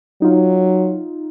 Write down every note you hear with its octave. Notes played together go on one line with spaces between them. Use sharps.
F#3 D#4 F4